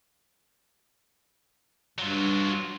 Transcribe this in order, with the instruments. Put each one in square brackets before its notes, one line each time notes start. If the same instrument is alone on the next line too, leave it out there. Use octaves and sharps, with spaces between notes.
[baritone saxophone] G2 [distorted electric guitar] F#3 F4